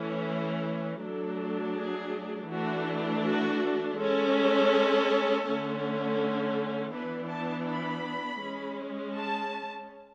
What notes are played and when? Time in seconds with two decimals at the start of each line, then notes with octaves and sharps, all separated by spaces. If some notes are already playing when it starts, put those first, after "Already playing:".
Already playing: E3 A3 C#4
1.01 F#3 A3 D4 A4
1.75 G#4
2.49 E3 A3 D4 F#4
3.24 F#4
3.97 G#3 C#4 A4
5.45 D3 A3 C#4
6.92 E3 B3 D4 B4
7.29 A5
7.66 B5
8.41 G#3 C#4
9.14 A5